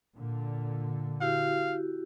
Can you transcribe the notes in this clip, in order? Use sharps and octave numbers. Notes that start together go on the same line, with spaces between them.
A#2 D3
E4 F#4 G4 F5